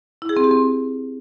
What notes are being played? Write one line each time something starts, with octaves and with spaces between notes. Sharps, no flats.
E4
G#4
C4
G4
C4